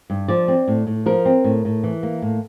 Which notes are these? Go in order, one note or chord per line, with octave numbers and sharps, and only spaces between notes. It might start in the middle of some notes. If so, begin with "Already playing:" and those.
G2
F3 D5
C4
A2
A2
F3 A#4
C4
A2
A2
E3
A#3
A2